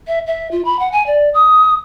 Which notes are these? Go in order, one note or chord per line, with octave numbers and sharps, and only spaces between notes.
E5
E5
F4
B5
F#5
G#5
D5
D#6